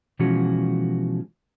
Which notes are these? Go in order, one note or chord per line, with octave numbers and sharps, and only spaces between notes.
B2 E3 F3 G#3 C#4 F#4